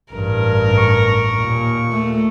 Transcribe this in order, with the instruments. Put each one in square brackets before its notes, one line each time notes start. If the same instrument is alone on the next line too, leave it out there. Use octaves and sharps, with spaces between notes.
[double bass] A1 G2 [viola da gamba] A#4
[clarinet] C#6
[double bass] D#2 A#2
[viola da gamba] A3